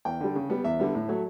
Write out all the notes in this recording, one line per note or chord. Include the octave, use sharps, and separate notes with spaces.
E2 G5
D3 G3
C#3
G3 B3
E2 E5
D3 G3 B3
A2
F#3 A3